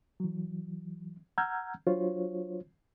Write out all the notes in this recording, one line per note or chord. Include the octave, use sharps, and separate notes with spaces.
E3 F#3
F#5 A#5 E6 F6 G6 G#6
F#3 D4 F4 F#4 C5 C#5